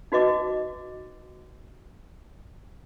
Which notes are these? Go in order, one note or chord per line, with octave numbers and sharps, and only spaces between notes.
D#4 F#4 B4 D#5 D6